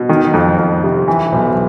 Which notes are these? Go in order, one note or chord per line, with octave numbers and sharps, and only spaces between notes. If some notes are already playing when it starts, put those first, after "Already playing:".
Already playing: B2
D#3
F2
F2
C3
E3
B1